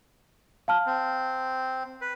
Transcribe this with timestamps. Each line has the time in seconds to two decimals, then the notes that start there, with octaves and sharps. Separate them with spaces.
0.68 F5 A5 F6
0.86 C4
2.01 B4